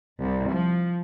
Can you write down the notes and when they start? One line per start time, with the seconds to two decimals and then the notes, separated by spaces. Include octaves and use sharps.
0.21 C2
0.53 F3